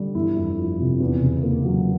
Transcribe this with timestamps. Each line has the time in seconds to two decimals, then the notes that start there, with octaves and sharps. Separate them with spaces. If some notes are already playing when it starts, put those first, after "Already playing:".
Already playing: D3 G3
0.15 G1 E4
0.36 F2
0.58 F3
0.79 C3
1.00 E2
1.21 C#3
1.43 A#3
1.65 F#3